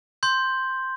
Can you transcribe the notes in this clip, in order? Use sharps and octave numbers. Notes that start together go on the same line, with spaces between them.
C6 G6